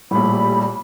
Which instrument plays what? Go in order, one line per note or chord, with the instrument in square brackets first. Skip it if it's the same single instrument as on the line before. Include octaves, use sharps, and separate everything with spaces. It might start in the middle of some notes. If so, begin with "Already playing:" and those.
[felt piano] A#1 A2 [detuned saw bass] G3 [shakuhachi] B5